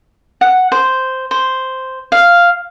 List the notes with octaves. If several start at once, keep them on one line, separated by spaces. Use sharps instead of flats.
F#5
C5
C5
F5